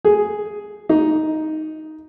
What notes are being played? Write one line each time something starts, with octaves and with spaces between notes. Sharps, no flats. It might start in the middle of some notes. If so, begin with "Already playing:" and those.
G#4
D#4